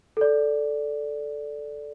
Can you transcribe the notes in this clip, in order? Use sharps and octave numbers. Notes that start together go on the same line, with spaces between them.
A4 D5